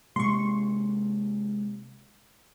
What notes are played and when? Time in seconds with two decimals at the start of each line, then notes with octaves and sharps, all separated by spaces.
0.16 C3 G#3 A#3 C6 C#6